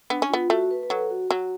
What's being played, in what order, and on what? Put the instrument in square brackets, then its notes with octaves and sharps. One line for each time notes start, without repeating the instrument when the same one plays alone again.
[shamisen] B3 [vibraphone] D4
[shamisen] C#4
[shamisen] B3 [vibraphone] F4
[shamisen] A3 [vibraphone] F#4
[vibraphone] B4
B4
[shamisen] F#3 [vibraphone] A4
[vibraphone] F#4
[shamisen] F#3 [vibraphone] F#4